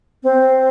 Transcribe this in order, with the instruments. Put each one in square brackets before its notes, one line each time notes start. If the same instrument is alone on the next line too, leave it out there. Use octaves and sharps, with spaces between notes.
[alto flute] C4